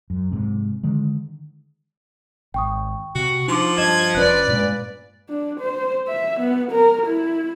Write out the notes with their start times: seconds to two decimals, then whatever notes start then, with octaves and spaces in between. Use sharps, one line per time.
0.10 F#2
0.32 G#2 C3
0.83 D3 D#3 G#3
2.54 G#1 G5 C#6 D#6
3.15 C3 F#4
3.48 F3 D4 D#4 C6 D6
3.78 G2 D#5 A5 G#6 E7
4.15 F1 C#4 B4 D5 F#6
4.48 G2 A#2 G#3
5.29 D4
5.60 C5
6.08 E5
6.40 B3
6.71 A#4
7.06 E4